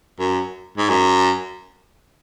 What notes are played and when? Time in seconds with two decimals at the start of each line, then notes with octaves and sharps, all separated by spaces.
0.19 F#2
0.77 G#2
0.89 F#2